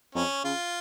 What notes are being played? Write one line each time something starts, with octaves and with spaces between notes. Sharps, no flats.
F2 C#4
C#3 F4